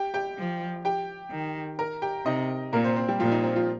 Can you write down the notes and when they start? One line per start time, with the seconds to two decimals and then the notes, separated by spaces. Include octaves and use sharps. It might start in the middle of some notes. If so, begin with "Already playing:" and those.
Already playing: G4 G5
0.14 G4 G5
0.38 F3
0.85 G4 G5
1.31 D#3
1.79 A#4 A#5
2.02 G4 G5
2.26 C3 D#4 D#5
2.73 A#2 A#3 A#4
2.84 C4 C5
2.96 C4 C5
3.09 G3 G4
3.20 A#2 F3 F4
3.31 D#4
3.43 C4
3.56 F3 F4